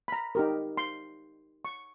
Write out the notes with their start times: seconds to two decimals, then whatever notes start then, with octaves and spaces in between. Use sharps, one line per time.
0.08 B5
0.12 A#5
0.35 D#4 G4 A#4
0.77 C6
1.65 C#6